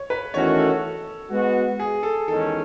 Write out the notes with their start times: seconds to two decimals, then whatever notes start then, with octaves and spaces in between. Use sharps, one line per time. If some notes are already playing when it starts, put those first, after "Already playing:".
Already playing: C#5
0.10 B4
0.34 E2 D#3 A3 C#4 F#4 C#5
0.59 A4
1.30 G#3 B3 F#4
1.80 G#4
2.03 A4
2.27 E2 D#3 G#3 C#4 A4